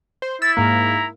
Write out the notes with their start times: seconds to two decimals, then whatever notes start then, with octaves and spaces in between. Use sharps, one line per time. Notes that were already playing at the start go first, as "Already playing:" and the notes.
0.22 C5
0.42 E4 E6 A6
0.57 G#2 A#3 A#5